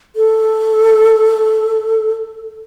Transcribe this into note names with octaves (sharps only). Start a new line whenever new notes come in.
A4